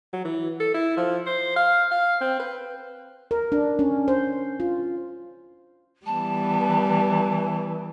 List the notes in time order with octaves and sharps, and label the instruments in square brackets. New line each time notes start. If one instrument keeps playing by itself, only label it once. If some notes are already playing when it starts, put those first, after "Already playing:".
[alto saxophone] F#3
E3
A4
E4
F3
C5
F5
F5
C4
B4
[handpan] A#4
D4
C#4
C5
F4
[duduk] E3 [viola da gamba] G3 B3 [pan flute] A5